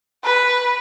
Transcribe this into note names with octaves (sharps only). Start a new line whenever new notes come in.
B4